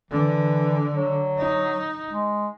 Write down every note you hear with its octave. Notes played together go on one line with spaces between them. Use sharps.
D3 E3
F#3
D#4
G#3